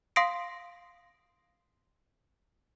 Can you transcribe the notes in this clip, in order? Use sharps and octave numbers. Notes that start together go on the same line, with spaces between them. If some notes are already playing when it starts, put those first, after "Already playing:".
F5 C6 D#6 A#6 C7 D7